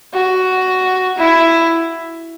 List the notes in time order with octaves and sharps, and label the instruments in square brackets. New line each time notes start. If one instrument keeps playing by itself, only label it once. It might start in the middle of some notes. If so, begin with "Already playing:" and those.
[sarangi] F#4
E4